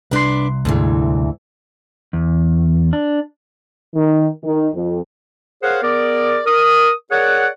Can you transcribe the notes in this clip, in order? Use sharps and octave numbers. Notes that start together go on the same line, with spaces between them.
C2 D4 B4 C6
D2 G#2 E3
E2
D4
D#3
D#3
F2
G#4 A#4 C5 C#5 F5 F#5
B3 G#4 A#4 D5
A#4 D#6
G#4 A#4 C#5 D5 F#5